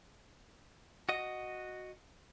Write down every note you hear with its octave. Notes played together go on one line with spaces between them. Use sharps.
F#4 D#5